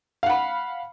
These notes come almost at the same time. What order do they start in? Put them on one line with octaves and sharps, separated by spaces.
F5 F#5 B5